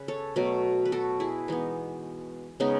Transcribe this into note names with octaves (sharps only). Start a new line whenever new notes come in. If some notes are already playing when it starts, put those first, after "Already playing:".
Already playing: C#3 B4
A4 C#5
B2 F#3 A3
B4
F#4 A4
E4 G#4
E3 G#3 B3 D#4
C#3 G#3 B3 D#4